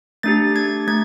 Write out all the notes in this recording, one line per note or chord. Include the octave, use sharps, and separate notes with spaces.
A3 D4 G4 A6
G#6
A3 G#6